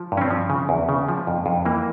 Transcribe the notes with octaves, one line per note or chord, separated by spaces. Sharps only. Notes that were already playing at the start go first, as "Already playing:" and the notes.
Already playing: F3
G2
C#4
C4
F3
C#3
E2
C#3
F3
F2
F2
E3 A#3